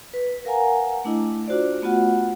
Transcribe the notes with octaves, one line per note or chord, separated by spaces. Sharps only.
B4
A#4 F5 F#5 G#5 A#5
A3 D4 E4 D#5
D4 F4 F#4 C5 D5
A3 B3 F4 F#4 F#5